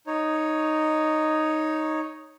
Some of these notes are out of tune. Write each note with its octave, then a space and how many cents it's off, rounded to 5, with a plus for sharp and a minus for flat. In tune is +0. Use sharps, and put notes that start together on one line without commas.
D#4 +0 C#5 +0